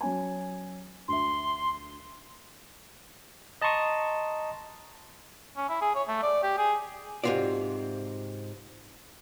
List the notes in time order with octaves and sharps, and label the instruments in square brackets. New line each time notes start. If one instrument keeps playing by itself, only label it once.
[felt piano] F#3 C#4 G#5
[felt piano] D2 E5 [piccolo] C6
[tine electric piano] D#5 A5 A#5 C6 C#6 D#6
[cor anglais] C#4
E4
G#4
C#5
A3
D5
G4
G#4
[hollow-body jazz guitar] G#2 C3 F#3 F4 F#4 D5